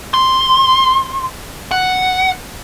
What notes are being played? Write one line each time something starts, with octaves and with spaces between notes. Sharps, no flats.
C6
F#5